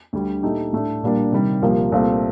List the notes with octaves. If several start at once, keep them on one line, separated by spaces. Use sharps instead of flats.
D2 D3 G3
A#2 A3 D#4 G4
A2 A3 D4
A#1 A#2 G3 A#3 D4
C3 D#3 G3
C2 A#2 F3 A#3
C2 A#2 A3 C4 F4